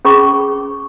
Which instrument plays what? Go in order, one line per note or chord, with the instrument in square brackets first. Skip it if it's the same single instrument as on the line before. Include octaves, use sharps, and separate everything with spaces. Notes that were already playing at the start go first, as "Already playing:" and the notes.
[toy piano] C#4 G#4 B5 C#6